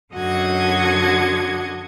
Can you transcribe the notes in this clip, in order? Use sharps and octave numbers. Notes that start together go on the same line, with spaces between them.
F#2 D3 F#4 D#5 F#5 G#6